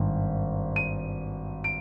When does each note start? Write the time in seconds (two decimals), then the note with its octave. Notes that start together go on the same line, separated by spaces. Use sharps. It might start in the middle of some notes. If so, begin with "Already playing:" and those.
Already playing: G#1 G2 D#3
0.76 D#7
1.64 D7